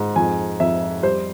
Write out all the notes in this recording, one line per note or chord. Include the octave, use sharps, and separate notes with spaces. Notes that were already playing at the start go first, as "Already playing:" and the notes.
Already playing: G#2
F2 G#5
F2 E5
G3 C5